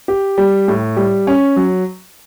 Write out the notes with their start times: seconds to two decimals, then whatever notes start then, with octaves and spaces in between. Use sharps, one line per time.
0.08 G4
0.38 G3
0.68 A2
0.97 G3
1.27 C#4
1.56 F#3